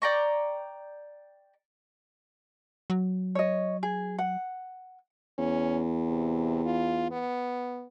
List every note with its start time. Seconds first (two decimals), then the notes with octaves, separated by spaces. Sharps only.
0.02 D5 G5 A#5 C#6
2.90 F#3
3.35 C#5 D#5
3.83 G#4
4.18 F#5
5.38 E2 C#4
6.08 C3
6.65 F4
7.11 B3